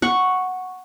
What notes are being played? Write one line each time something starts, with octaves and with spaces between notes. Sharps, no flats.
F#5 C#6